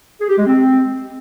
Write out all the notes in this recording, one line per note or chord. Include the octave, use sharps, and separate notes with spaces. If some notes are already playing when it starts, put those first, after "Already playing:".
G#4
G4
G#3
C4